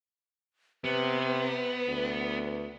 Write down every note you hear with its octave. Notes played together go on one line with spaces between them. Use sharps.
C3 B3 B4
D2